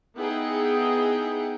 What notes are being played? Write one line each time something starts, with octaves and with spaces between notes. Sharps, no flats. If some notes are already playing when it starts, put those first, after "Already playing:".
B3 D#4 E4 G#4 F#5 G5